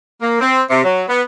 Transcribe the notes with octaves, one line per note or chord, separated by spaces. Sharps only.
A#3
C4
C3
F#3
B3